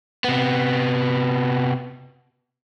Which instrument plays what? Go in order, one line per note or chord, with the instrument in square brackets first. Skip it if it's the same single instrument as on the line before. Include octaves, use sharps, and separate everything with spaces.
[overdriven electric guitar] C3 B3